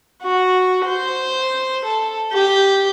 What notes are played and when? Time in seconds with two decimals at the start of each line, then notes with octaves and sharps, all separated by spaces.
0.21 F#4
0.85 C5
1.83 A4
2.32 G4